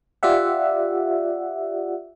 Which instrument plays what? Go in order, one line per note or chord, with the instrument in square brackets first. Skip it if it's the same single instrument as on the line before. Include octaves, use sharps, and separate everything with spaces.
[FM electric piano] F4 G4 D5 E5 F#5